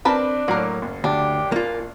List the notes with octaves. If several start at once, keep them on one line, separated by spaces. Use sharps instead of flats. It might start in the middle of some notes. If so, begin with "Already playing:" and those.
C4 D4 A#4 B4 A5 B5
A2 F#3 A#3 F#4 A#4
F#1
D2 D4 G4
A#2 A#3 F4